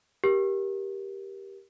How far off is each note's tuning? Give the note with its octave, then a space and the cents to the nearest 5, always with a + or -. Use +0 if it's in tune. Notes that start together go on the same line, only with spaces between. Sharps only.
G4 +0 A#4 +20